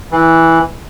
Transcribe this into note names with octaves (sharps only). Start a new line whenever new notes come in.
E3